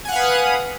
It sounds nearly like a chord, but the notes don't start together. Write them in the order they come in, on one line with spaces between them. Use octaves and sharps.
G#5 F#5 F5 B4 D#6